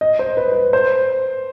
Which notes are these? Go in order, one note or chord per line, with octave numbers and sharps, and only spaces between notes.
D#5
C5
B4
B4
C5